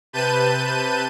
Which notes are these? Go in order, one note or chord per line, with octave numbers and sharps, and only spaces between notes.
C3 B4 A5 G6 D#7